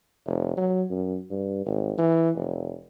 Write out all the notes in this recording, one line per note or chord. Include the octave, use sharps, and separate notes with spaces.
F1
F#3
F#2
G2
G#1
E3
F1